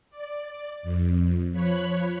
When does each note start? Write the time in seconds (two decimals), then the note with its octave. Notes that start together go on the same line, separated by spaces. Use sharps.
0.10 D5
0.83 F2
1.53 F3 C#5 B5 F#6